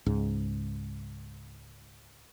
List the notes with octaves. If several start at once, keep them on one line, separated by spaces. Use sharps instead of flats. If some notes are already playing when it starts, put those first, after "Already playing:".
C#2 G#2